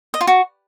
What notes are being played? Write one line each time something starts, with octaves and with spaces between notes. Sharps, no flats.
D#5
F4
F#4